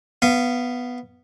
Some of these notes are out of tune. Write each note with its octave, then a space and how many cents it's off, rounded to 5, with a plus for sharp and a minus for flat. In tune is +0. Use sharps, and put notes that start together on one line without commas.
B3 +0 F5 -20